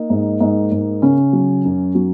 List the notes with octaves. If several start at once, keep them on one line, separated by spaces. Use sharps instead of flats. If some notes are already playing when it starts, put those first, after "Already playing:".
Already playing: A#3 D#4
G#2
G#2
G#2
C#3 C#4
F#3
F#2
F#3